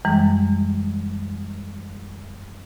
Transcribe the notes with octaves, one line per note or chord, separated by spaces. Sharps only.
F#2 E3 G3 G#3